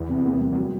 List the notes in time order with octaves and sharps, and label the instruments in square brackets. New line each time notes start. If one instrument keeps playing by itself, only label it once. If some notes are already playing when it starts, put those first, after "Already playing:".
Already playing: [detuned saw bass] E2 [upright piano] E3
[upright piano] C3
A#3
G3
[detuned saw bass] E2
[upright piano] F#3